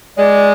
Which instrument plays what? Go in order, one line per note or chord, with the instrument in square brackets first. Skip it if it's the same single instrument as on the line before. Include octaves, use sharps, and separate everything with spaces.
[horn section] G#3 [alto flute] D5